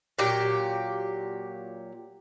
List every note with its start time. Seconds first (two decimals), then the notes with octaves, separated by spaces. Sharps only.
0.19 A#2 F#3 G4